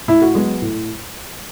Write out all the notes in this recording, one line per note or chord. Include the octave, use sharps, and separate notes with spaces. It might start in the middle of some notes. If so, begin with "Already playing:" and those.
A2 E4
F#4
F#3 G#3 B3 G#4
A2